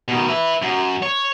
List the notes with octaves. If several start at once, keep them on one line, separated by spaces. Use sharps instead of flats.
B2 D#3
B4 E5
F#2
C#5